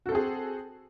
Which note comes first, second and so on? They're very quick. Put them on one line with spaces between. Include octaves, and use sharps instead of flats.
F#4 A4 C4 G#4